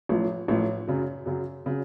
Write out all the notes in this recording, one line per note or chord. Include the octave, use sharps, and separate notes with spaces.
A1 A2 F3
A1 A2 F3
F#2 C#3 F#3
F#2 C#3 F#3
C#3 F#3